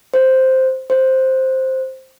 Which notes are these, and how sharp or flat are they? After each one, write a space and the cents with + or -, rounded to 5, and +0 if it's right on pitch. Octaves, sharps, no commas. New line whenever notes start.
C5 +0
C5 +5